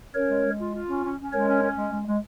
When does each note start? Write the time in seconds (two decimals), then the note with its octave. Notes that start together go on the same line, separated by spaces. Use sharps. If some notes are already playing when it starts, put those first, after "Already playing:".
0.15 C#4 A#4 C#5
0.29 G#3
0.43 G#3
0.59 F4
0.73 F4
0.89 C#4
1.03 C#4
1.18 C#4
1.33 G#3 A#4 C#5
1.48 C#4
1.62 C#4
1.77 G#3
1.91 G#3
2.07 G#3